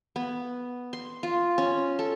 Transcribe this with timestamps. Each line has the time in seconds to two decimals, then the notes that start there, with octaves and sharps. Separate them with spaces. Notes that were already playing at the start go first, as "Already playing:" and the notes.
0.16 B3
0.93 C6
1.23 F4
1.58 C#4
1.99 A4